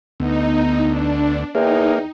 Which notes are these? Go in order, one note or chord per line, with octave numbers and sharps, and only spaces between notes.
D2 B3 D#4
D4
E2 A#3 D#4 G5